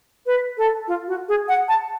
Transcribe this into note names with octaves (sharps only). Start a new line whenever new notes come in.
B4
A4
F4
F#4
G#4
F#5
A5